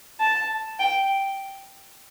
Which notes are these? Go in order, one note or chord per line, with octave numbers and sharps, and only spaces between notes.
A5
G5